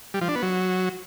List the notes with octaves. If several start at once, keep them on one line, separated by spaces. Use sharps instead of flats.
G3
F3
D4
B3
F#3